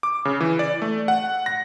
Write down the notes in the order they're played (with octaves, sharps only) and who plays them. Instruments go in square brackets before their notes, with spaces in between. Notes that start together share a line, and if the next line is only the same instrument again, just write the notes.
[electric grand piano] D6
C#3
E3
D5
A3
F#5
A#6